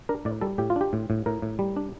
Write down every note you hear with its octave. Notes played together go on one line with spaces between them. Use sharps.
D4 A#4
A2 D5
G3 A4
A2 G4
F4
D4 G4
A2
A2
A2 A#4
A2
G3
D4